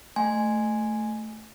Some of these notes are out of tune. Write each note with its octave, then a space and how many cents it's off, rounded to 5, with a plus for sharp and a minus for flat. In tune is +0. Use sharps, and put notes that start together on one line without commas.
A3 +0 G#5 +0 C6 +0